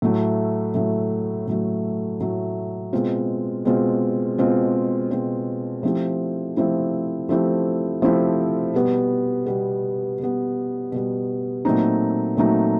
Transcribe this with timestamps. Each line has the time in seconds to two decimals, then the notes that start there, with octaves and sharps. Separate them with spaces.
0.02 A2 F#3 A3
0.74 A2 F#3 A3
1.47 A2 F#3 A3
2.21 A2 F#3 A3
2.93 B2 G#3 C4 F4
3.65 B2 G#3 C4 F4
4.38 B2 G#3 C4 F4
5.11 B2 G#3 C4 F4
5.83 F3 A3 C4 E4 G4
6.57 F3 A3 C4 E4 G4
7.29 F3 A3 C4 E4 G4
8.02 F3 A3 C4 E4 G4
8.73 B2 G3 B3
9.46 B2 G3 B3
10.19 B2 G3 B3
10.92 B2 G3 B3
11.65 A#2 F#3 A3 C4 D#4
12.37 A#2 F#3 A3 C4 D#4